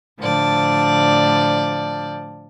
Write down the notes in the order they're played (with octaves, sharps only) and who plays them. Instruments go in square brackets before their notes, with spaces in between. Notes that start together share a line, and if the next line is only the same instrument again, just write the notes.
[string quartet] A2 D3 F3 D5 A5